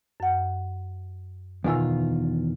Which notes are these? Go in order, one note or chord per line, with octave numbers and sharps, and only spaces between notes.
F#2 F#5
E2 B2 D#3 F4 G#5 E6